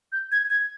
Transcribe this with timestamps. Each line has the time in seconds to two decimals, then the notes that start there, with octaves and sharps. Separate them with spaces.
0.12 G6
0.32 G#6
0.50 G#6